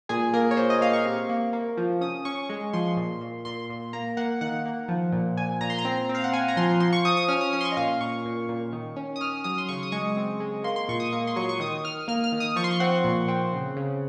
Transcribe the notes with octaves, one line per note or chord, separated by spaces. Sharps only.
A#2 G#4
A#3 A#4
C#5
A#2 C5
D#5
A#3 F5
C#6
C3
A#3
A#3
F3
C#4 D#6
C#4 C#6
G#3
F3 C6
A#2
A#2
A#2 C6
A#2
A#3 A#5
A#3 F#5
D#3 F#5
A#3
F3
A#2
A#2 G#5
A#2 A#5
C6
A#5
C4
C4
F5
F#5
C4 G#5
A#5
F3 C6
F3 C6
C#6
F3 D#6
D#6
C#4 F6
D#6
C#4 D#6
C6
C#6
D#5
A#2 F5
A#2 C#6
A#2
A#2
D#3
C#4
D#6
C#4 F6
F#3 D#6
C6
C#3 C#6
D#6
G#3 C#6
C4
G#3
A#3 C6
C6
A#2 C#6
D#6
A#3 C#6
C6
F#3 C#6
C#6
D#3 D#6
D#3 F6
A#3 F6
F6
D#3
D#6
F3 C#6
C6
C#6
C4 F#5
A#2
C4
C#3
C#3